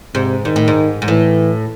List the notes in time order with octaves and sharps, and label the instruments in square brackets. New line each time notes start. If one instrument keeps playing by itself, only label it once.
[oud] G#2 [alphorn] C3
[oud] G#2 [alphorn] D#3
[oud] A2
G#2
G#2
[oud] A2 [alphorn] E3